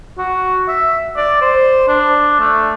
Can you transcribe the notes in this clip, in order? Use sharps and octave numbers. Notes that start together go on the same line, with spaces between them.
F#4
E5
D5
C5
D4
A3